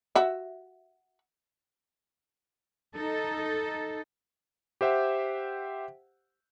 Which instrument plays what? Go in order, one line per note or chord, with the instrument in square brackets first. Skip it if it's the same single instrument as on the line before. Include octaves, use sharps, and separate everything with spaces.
[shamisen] F#4 E5
[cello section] D#4 A4
[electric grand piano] G4 C5 E5 F#5 G5